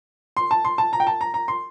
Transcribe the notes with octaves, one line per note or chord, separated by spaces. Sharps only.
C6
A5
C6
A5
A#5
G5
A5
A#5
A#5
C6